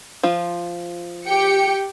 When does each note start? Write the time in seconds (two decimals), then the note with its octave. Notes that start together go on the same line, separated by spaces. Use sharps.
0.23 F3 F4
1.27 G4 G5 C#7